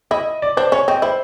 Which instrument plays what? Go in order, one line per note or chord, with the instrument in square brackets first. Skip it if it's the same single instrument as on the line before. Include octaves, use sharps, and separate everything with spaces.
[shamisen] E4 [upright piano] D#5
[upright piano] D5
[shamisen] D4 [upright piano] C5
[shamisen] C#4 [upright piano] C#5
[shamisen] C4 [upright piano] D#5
[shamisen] E4 [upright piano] C5